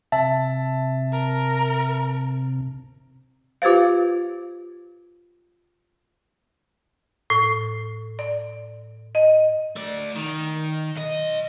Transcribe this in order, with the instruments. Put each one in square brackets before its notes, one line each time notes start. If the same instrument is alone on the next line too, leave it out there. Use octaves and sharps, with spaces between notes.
[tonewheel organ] C3 [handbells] E5 [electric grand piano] A5
[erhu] A#4
[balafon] F4 G4 B4 C5 F5
[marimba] A2
D5
D#5
[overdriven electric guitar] A3 D5
D#3
B1 D#5